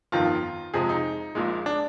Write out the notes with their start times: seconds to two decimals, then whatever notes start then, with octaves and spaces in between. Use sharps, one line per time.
0.12 G1 F2 D#3 F4
0.74 F2 C3 F3 G#3 G#4
0.89 D#4
1.35 A#1 A#2 G#3
1.66 D4